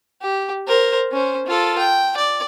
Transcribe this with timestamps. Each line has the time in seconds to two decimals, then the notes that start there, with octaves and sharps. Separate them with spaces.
0.22 G4
0.68 A#4 C5
1.12 C#4 C5
1.47 F4 A4
1.78 G5
2.17 D5